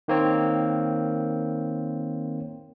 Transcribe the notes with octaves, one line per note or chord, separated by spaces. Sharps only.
D#3 A#3 C4 C#5